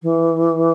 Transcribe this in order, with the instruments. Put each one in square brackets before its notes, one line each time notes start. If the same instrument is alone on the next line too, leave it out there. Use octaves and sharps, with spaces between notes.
[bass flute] E3